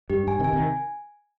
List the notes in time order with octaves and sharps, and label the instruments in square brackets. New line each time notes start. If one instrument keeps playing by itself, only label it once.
[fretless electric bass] G2 [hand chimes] G4
[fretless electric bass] G2 [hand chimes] G#5
[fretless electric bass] C3 D#3
[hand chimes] G#5
[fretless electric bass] C3 D#3